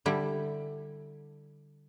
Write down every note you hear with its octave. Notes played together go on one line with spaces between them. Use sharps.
D3 G3 E4